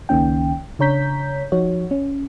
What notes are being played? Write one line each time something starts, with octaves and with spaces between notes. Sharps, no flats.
C#2 D#3 A#3 C#4 G5
C#3 D4 C#5 A#5 G6 B6
F3 D#4 F#4 C#5
C#4